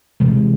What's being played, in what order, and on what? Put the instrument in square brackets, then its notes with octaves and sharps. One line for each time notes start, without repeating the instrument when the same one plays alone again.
[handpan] C3 E3 G#3